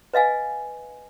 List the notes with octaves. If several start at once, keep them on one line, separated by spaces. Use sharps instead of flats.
B4 D#5 F5 G#5